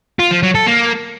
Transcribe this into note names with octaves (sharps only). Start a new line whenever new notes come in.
F4
F3
F#3
A4
A#3